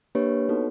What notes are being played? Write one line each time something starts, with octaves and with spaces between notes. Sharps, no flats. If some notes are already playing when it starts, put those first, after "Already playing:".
A#3 D4 G4 B4 C#5
B3 D#4 F#4 A4